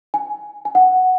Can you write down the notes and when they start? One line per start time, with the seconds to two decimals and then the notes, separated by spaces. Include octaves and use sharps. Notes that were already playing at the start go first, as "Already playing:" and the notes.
0.14 G#5
0.65 G#5
0.75 F#5